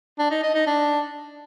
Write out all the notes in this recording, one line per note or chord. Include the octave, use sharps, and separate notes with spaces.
D4
D#4
D#5
D#4
D4